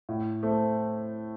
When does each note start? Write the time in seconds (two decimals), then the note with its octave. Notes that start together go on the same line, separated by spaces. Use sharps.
0.09 A2
0.43 A3 C4